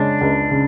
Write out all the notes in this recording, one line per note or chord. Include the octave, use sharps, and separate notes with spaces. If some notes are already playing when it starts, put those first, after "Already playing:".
Already playing: C#3 G#3 C#4 D4
C#2
C#3